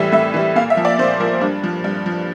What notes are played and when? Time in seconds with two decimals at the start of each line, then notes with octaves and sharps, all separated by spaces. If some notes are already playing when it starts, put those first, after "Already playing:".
Already playing: A2 E3 G3 E5
0.12 A2 E5
0.34 E3 G3
0.56 A#2 F5
0.70 E5
0.77 F3
0.85 D5
0.99 A#2 C5
1.20 F3 A#4
1.41 G2 D4
1.64 F3
1.84 G2
2.06 F3